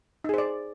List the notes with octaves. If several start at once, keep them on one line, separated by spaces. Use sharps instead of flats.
D#4 G#4 C5 D5